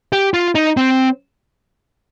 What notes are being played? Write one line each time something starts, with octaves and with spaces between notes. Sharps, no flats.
G4
F4
D#4
C4